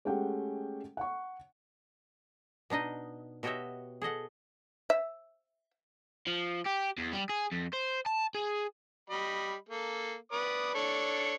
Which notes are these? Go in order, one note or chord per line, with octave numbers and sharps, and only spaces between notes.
G#3 A3 C#4 G4 F#5 G5
F#5 C#6
B2 D4 D#4 D#5
B2 F#4 G4 C#5 D#5 E5
G#4 A4 D#5 F#5
E5
F3
G4
E2
G3
G#4
F2
C5
A5
G#4
G3 D#5 B5
A#3 A4
B4 D5 D#6
D4 A4 C#5